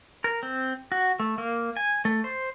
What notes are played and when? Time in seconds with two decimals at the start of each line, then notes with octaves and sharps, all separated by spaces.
0.24 A#4
0.43 C4
0.92 F#4
1.20 A3
1.38 A#3
1.77 G#5
2.05 A3
2.24 C5